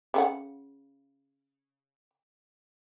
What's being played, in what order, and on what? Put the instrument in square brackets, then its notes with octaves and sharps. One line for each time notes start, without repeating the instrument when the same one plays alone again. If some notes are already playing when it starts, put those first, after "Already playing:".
[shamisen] C#3 C#4 F#5